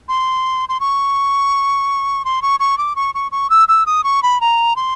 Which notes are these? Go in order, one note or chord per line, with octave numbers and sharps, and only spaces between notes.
C6
C6
C#6
C6
C#6
C#6
D6
C#6
C#6
C#6
E6
E6
D#6
C#6
B5
A#5
C6